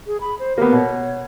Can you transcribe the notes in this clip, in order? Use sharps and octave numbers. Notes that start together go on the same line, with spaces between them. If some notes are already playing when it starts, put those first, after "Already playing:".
G#4
B5
C5
A#3 B3 G4
B2 C#5